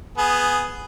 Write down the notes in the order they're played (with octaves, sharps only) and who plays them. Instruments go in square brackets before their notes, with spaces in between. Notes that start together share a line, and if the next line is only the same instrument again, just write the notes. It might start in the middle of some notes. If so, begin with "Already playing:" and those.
[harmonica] B3 G#4